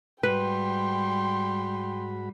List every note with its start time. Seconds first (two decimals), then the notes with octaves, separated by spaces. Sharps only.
0.23 G#2 G3 F#4 B4 G5 B5 C6